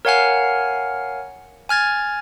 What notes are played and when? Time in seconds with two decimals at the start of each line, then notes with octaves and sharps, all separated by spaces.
0.05 A#4 C#5 F5 F#5 G#5 F6
1.69 G#5 F6 G#6 A6